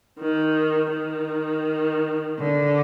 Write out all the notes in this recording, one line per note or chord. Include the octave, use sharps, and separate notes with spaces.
D#3
D#3
D3